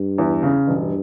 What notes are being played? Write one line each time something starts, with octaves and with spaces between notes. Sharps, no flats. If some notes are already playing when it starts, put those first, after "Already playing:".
Already playing: G2
E2
C#3
E1 G2